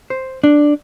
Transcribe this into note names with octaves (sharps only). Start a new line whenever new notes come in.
C5
D4